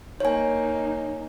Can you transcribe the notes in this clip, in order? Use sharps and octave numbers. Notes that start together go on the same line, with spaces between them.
A#3 D#4 C#5 G#5